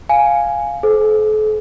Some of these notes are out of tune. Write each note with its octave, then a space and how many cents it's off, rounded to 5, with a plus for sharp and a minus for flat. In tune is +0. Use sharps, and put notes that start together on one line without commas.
F5 +0 G#5 +0
A4 -40 C5 +0